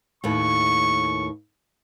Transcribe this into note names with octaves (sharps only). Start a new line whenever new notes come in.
D#2 A2 B4 C#6